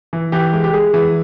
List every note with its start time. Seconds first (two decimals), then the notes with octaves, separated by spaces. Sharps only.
0.13 E3
0.32 E3 G4
0.53 G#3
0.64 G4
0.73 G#3 G#4
0.94 E3